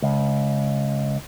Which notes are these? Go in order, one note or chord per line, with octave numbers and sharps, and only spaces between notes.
C#2